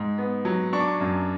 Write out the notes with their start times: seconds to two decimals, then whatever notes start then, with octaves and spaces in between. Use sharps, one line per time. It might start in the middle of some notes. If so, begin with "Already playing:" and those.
Already playing: G#2
0.18 B3
0.45 F#3
0.73 D4 C#6
0.80 D6
0.88 C#6
1.00 F#2